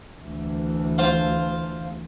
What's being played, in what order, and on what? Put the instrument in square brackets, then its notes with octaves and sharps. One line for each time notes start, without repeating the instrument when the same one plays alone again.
[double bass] D2 E3
[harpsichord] F4 C5 F5